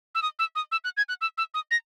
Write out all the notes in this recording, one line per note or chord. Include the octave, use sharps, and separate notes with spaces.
E6
D#6
E6
D#6
E6
F#6
G#6
F#6
E6
E6
D#6
A#6